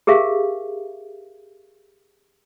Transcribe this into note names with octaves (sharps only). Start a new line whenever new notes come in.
G4 G#4 A#4 E5 F5